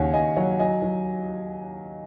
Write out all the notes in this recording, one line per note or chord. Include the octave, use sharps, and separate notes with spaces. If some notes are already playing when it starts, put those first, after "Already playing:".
Already playing: D#2 C#3 C#5 F#5 G#5
D#2 D#5 G#5
F#3 C#5 F#5
F#5
F#3 D#5 G#5
F#3